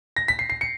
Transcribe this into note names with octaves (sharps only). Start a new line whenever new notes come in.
A#6
B6
C7
C7
C#7